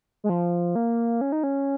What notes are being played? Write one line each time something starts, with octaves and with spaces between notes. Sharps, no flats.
G#3
F3
A#3
C#4
D#4
C#4